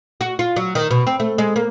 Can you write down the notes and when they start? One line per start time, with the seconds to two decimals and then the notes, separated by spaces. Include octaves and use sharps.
0.21 F#4
0.39 F4
0.56 F#3
0.75 D#3
0.91 B2
1.07 C4
1.20 A3
1.38 G#3
1.56 A#3